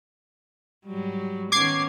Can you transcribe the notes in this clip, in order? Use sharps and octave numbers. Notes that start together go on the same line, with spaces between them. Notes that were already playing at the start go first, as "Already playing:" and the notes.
G#2 F#3 G3
D#3 B3 C#4 D6 G#6 C7